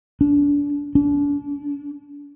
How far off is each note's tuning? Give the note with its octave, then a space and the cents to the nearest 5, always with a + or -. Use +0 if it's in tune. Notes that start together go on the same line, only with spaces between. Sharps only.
D4 -35
D4 -40